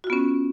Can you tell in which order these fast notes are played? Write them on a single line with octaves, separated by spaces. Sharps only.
F#4 F4 B3 C#4